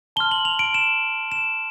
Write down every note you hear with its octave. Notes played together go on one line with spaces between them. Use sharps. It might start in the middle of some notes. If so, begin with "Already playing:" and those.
A5 C6 F6 G7
F#7
F7
D7
E7
E7